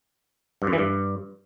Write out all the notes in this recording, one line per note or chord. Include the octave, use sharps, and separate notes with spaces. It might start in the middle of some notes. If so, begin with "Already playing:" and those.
G2
F#2
E3
G2